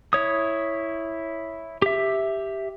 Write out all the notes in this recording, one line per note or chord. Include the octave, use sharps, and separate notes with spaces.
E4 C#5 D#6
G4 E5